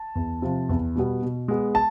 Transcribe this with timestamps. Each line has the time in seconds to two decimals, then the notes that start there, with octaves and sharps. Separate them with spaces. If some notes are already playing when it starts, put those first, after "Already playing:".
Already playing: A5
0.15 E2
0.42 C3 F3
0.69 E2
0.95 B2 G3 B3
1.22 B2
1.48 G#3 B3
1.75 A5